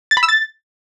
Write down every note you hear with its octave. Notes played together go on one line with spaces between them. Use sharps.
A6
B5
E6
A6